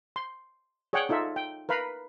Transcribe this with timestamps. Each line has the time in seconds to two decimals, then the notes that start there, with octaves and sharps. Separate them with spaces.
0.16 C6
0.93 G#4 C#5 D5 F#5 G5
1.09 D#4 F4 A4 E5
1.36 G5
1.69 A#4 B4 F5 B5